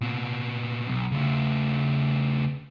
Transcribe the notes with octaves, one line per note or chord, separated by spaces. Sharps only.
A#2 B3
B1
C#3 A3